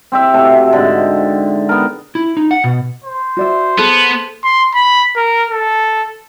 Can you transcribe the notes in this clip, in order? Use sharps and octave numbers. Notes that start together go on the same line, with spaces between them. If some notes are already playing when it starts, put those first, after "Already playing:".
C4 G4 E5
C3 A3 F#4
G#2 D3
B3 A#4
E4
D#4
F#5
B2
C5
F#4 D5 E5
B3 G#4 A4
C6
B5
A#4
A4